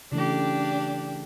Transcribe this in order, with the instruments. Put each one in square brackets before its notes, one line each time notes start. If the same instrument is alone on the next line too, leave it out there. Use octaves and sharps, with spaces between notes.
[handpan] C#3 E3 A3 [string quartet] D4 G4